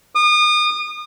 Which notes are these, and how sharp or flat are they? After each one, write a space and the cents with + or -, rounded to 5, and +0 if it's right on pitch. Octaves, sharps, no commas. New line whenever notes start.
D#6 -35